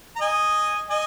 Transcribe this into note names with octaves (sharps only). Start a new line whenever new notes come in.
A#5
D#5 G#5
D#5 G#5